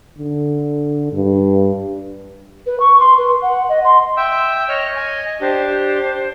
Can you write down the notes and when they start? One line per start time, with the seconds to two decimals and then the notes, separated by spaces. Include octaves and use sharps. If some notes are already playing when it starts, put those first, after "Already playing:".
0.18 D3
1.13 G2
2.66 B4
2.80 C#6
3.00 C6
3.18 B4
3.42 F#5
3.69 D#5
3.84 C6
4.17 E5 G5 E6
4.69 C#5 D#5 F6
4.96 G#5
5.41 D4 G4 C5